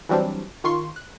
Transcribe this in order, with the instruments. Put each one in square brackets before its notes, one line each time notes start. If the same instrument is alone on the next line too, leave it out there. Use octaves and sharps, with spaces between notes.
[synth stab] E3 F#3 G3 C4 D4
D#3 F4 C6 C#6 C7
F#6